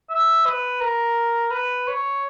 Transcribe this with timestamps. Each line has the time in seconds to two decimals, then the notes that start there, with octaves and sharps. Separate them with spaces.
0.10 E5
0.46 B4
0.81 A#4
1.51 B4
1.88 C#5